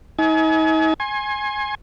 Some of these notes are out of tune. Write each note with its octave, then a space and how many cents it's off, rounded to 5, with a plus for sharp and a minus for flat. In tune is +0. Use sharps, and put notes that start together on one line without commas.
D#4 +40 G#5 +35
G#5 +0 C6 +35